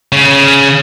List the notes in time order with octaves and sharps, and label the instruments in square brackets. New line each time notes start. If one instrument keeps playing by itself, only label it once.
[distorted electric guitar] C#3